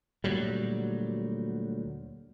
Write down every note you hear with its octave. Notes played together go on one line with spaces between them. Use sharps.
D2 A#2 F#3 G3